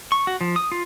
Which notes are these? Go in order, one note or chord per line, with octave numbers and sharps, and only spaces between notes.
C#6
F#4
F3
D#6
F4